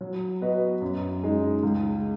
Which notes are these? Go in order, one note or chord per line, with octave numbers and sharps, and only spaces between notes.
F#3
B3 F#4 B4 D#5
F#2
C#3 G#3 D#4
C#2